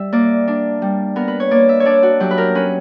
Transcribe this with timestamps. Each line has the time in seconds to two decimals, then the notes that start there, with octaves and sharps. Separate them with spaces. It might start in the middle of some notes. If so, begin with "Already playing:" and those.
Already playing: G3 E5
0.12 A#3 D5
0.48 D4
0.82 G3
1.16 B3 A#4
1.28 B4
1.40 C#5
1.51 A#3 D5
1.69 E5
1.80 C#5
1.85 D4 D5
2.03 F#4
2.20 F#3 G4
2.31 B4
2.38 A#4
2.55 C#4 B4